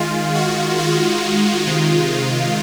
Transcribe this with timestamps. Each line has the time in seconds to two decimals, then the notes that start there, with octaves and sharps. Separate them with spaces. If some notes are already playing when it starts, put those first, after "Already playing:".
Already playing: D#3 G#3 F4
0.35 F#4
0.79 F4
1.66 C3 D#3 G#3